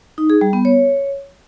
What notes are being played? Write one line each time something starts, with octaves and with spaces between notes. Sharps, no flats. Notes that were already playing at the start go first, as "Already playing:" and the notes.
D#4
G#4
G3
B3
C#5